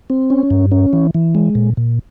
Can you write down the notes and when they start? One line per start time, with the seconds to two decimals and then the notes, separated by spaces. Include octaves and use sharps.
0.10 C4
0.30 C#4
0.51 G2
0.71 C#4
0.93 E3
1.15 E3
1.35 G#3
1.55 A#2
1.77 A#2